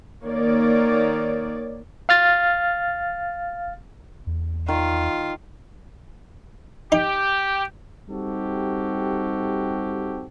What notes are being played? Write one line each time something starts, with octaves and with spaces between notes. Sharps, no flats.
D#3 A#3 C#5 D5
F5 F6 A6
E2
D#3 F4
D#4 G4
G3 C4 D#4 F#4 G4 A4